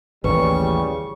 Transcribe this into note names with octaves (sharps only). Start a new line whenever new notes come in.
A1 D#2 C#3 E3 G3 B4 C#6